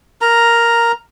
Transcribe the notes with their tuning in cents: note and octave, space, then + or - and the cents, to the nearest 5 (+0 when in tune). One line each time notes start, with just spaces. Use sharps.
A#4 +0 A#5 +0